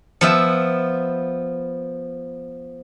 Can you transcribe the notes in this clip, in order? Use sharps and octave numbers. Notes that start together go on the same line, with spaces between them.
F3 B3 E5